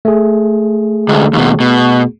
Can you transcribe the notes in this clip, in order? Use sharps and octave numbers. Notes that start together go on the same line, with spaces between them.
A3 G#4
D2 G#3
D#2 B2
B2